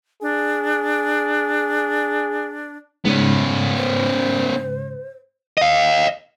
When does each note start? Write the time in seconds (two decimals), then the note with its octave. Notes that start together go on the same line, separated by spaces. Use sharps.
0.22 D4 G#4
3.05 G#2 C#3 B3 C#4
3.77 C5
5.58 D#5 F5